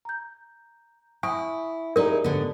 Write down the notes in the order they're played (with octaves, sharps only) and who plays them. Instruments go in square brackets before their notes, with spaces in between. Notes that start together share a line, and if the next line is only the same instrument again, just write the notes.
[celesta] A#5 G6
[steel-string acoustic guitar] E4 [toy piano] G#5 [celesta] C#6 D#6
[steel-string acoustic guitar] D#4 E4 G#4 [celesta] G4 D5 A#5 [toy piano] A#4
[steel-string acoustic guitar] G#2 D3 B3